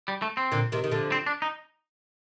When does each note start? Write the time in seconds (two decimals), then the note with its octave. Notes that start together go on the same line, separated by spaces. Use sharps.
0.08 G3
0.22 A3
0.37 C4
0.52 A#2 D3
0.72 C3 D#3
0.84 D#3
0.91 D3 F3
1.12 C4
1.26 D4
1.42 D#4